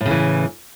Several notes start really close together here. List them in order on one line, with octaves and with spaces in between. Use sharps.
A2 C#3 E3